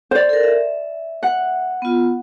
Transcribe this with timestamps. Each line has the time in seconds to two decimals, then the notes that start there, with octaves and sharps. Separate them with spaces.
0.11 C5 D5
0.29 A4 A#4
0.43 E5
1.23 F#5
1.82 B3 F4